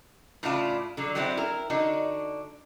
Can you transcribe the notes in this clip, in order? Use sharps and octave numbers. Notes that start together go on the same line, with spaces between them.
A2 C#3 D4 E4 F4 A5
D3 F#3
F#3 G3 C4 D4 E4 F#5
E4 A#4
D3 D4 D#4 F#4